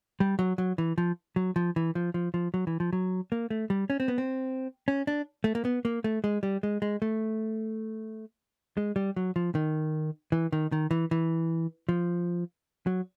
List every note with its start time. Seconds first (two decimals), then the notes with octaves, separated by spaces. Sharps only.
0.20 G3
0.39 F#3
0.58 F#3
0.78 E3
0.98 F3
1.36 F#3
1.56 F3
1.76 E3
1.95 F3
2.14 F3
2.34 F3
2.54 F#3
2.67 E3
2.80 F3
2.93 F#3
3.32 A#3
3.50 A3
3.70 G3
3.90 C#4
4.00 C4
4.08 B3
4.18 C4
4.88 C#4
5.07 D4
5.44 A3
5.55 A#3
5.65 B3
5.85 A#3
6.04 A3
6.24 G#3
6.43 G3
6.63 G#3
6.82 G#3
7.02 A3
8.77 G#3
8.96 G3
9.16 F#3
9.36 F3
9.55 D#3
10.32 E3
10.52 D#3
10.72 D#3
10.91 E3
11.11 E3
11.89 F3
12.87 F#3